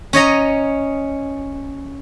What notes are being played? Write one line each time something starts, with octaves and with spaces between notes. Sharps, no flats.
C#4 C#5 D#5 A#5